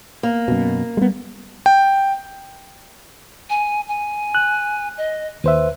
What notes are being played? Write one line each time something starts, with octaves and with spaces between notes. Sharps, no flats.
A#3
F#2 B2
G3 G#3 B3
G5
G#5
G#5
F#6
D#5
D#2 B4 C5 E5